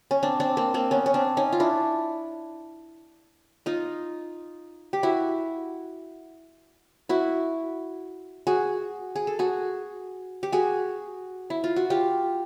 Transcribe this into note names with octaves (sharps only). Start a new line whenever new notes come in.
C#4
C4 D4
C4 D4
A#3 C4
A#3 C4
B3 C#4
C#4
C4 D4
C#4 D#4
F4
D4 E4
D#4 F4
G4
E4 F#4
E4 F#4
F#4 G#4
G#4
A4
F#4 G#4
G4
F#4 G#4
E4
F4
F#4
F4 G4